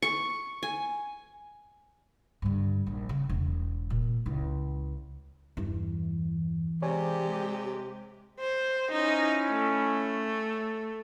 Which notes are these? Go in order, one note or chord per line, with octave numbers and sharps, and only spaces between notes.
C#6
G#5
G2 D3
A#1
C#3
E1
A#2
C#2 E4
E2 G2 E3
C3 G#3 G4 C#5 D5 G#5
C5
C#4 D#4 E4
A3